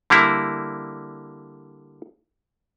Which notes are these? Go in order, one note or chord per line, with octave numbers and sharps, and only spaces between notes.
D3 G3 A#3 E4